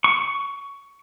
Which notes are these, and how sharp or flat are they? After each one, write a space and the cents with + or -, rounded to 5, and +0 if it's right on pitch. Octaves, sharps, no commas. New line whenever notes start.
C#6 +15